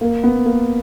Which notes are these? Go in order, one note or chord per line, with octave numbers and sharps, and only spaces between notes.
A#3
B3
A#3